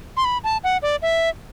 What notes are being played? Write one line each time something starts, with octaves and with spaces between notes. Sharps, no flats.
C6
B5
A5
F#5
D5
E5